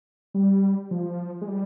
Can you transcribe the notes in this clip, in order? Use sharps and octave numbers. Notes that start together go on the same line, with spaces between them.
G3
F3
G#3
G3